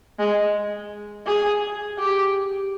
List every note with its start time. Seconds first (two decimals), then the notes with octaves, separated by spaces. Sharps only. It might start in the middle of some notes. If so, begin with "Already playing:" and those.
0.19 G#3
1.27 G#4
1.99 G4